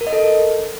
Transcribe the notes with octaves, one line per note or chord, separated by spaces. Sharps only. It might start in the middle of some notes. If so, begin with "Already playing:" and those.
A#4
D#5
A4